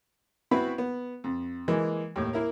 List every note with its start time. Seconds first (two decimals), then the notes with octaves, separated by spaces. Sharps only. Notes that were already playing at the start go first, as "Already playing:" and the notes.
0.51 B3 C4 E4 F#4 B4
0.78 B3
1.24 F2
1.68 E3 G#3 A#3
2.16 D#2 A2
2.33 A#3 E4 A#4